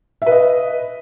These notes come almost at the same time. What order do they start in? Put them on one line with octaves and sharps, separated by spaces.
E5 B4 D#5